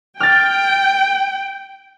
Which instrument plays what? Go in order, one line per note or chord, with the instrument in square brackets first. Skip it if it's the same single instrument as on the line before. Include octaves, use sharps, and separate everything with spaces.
[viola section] G5 [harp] F6 A6